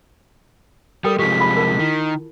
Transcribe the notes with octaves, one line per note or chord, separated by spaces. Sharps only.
G3 A4 A#4 G5 D#6
C3 F3 G#3 G4 B6
B5
F4 A#4 A5
D#3 E4